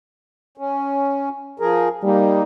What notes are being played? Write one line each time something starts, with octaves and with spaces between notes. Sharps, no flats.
C#4
F3 G#4 A#4
G3 A#3 D#4